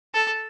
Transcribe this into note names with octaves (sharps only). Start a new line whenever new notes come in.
A4